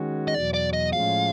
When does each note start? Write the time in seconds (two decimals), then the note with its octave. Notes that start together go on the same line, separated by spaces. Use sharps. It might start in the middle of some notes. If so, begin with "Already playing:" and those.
Already playing: D#3 G#3 C#4 F#4
0.28 D#5
0.34 E2 B2 F#3 D5
0.54 D5
0.73 D#5
0.93 A2 F3 G#3 C#4 F5